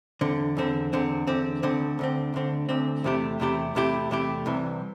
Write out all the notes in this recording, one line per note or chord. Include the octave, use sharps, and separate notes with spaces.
E2 D3 C4
E2 D3 C4
E2 D3 C4
E2 D3 C4
D2 D3 C4
D2 D3 C4
D2 D3 C4
D2 D3 C4
E2 C3 A3 E4 G4
E2 C3 A3 E4 G4
E2 C3 A3 E4 G4
E2 C3 A3 E4 G4
C2 C3 E3